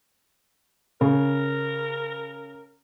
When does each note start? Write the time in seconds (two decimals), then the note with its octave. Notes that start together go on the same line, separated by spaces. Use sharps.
1.01 C#3 A#4